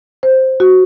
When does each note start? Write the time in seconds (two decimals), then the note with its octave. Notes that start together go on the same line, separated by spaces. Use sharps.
0.23 C5
0.60 F#4